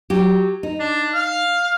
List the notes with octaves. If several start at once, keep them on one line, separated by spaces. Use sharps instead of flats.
F#3 G4
D#4
D4
F5